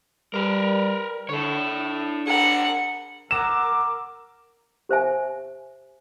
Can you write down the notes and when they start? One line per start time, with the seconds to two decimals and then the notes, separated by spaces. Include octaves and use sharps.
0.34 G3 A#4 B4
1.29 D3 A4 C#5
1.72 D4
2.28 G#4 A#4 F#5
3.31 A#4 F#5 A#5 D6 E6 E7
4.89 G4 C5 E5 G#5